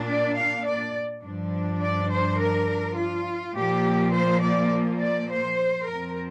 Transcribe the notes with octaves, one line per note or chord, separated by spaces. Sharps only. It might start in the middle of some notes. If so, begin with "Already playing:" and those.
Already playing: A#2 A#3 D4
D5
F5
D5
G2 F3 D4
D5
C5
A#4
F4
A#2 F3 A#3 G4
C5
D5
D5
C5
F2 F3 C4 A#4